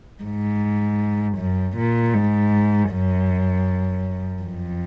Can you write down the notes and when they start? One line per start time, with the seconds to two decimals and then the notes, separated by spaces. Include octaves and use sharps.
0.24 G#2
1.39 F#2
1.77 A#2
2.14 G#2
2.90 F#2
4.43 F2